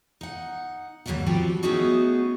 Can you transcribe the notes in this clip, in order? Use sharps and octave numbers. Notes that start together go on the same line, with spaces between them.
D#4 F#5
D#2 G#2 D#3 F#3 G3 F#5
F3 G3 C4 F#4 G4
A3 B3 C#4 D#4 F#4 G#4